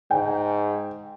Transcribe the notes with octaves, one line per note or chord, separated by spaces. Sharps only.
G#2 G5